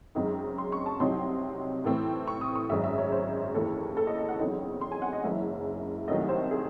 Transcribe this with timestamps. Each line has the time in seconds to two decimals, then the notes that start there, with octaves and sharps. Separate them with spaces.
0.15 F#2 C#3 G#3 C4 D#4
0.58 C6
0.72 C#6
0.86 A5
1.00 C2 C3 F#3 C4 D#4 C6
1.84 A2 E3 A3 C4
2.27 C#6
2.41 D#6
2.55 C#6
2.69 G#1 F#2 C#3 G#3 E5
2.84 E5
2.98 C#5
3.12 C5
3.54 D#2 C#3 E3 A4
3.97 A4
4.07 D#5
4.17 D#5
4.29 F#5
4.39 E2 C#3 F#3 C4 D#4
4.81 C6
4.92 G#5
5.02 F#5
5.13 D#5
5.23 F#1 F#2 C#3 E3 G#3 E5
6.08 C2 C3 D#3 F#3 A3 D#5
6.29 C5
6.51 G#4